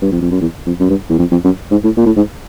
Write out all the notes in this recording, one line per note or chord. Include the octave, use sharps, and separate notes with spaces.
G2
F2
F2
F#2
E2
F2
F#2
G2
E2
F2
F2
F#2
G#2
A2
A#2
A2
G#2